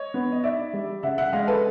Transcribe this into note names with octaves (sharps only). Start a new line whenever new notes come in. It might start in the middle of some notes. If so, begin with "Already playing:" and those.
Already playing: C#5 D#5
B3
D#5
D#4 D5 E5
G3
C#3 E5 F#5
E5 F#5
G#3 D#5 F5
A4 B4